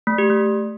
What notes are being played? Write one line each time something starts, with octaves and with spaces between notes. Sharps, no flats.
A3
G4
A3